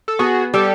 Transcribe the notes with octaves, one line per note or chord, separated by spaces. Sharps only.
A4
B3 F#4 G#4
G3 G4 A4